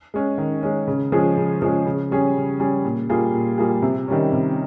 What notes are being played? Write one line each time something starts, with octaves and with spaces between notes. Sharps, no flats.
G#3 C#4
D#3
G#3 C#4
C#3
F3 G#3 C#4 G#4
C#3
F3 G#3 C#4 G#4
C#3
G3 C#4 G#4
C#3
G3 C#4 G#4
A#2
G3 A#3 F4 G#4
A#2
G3 A#3 F4 G#4
C3
D#3 G3 C#4
C3